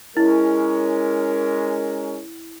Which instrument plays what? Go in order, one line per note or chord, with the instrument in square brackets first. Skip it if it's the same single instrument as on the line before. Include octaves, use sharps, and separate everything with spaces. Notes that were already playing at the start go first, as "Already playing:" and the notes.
[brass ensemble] G#3 C#4 A#4 [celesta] E4